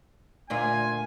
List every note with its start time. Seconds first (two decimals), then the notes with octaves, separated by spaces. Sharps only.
0.50 D2 A#2 F4 G#5